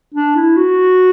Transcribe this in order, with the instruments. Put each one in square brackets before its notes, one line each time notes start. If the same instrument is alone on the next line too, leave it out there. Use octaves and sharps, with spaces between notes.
[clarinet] D4
E4
F#4